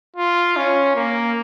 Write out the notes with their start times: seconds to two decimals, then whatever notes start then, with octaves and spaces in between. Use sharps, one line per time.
0.16 F4
0.56 C#4
0.96 A#3